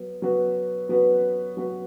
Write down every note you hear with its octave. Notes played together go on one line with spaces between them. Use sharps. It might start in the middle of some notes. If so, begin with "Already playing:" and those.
Already playing: F#3 B3
F#3 B3 F#4 B4
F#3 B3 F#4 B4
F#3 B3 F#4 B4